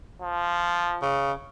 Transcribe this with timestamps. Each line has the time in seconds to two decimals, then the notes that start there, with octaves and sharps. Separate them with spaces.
0.21 F3
1.02 C#3